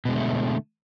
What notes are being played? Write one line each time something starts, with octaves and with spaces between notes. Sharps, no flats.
B2 D3 G#3 A3